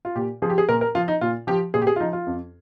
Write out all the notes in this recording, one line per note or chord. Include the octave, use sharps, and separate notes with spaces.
F4
A#2 G4
F3 G#4
G4
G#4
A#2 A#4
A#4
F3 F4
D#4
A#2 F4
F3 G4
A#2 G#4
G4
G#4
F4
F3 D#4
F4
F2